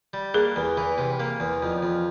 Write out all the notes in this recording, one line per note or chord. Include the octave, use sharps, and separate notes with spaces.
G3
A#3 G#4
E2
E3
C3
A#3
E2
F2
F2